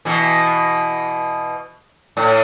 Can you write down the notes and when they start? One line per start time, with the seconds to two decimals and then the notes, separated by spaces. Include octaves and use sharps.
0.05 B2 E3
2.17 A2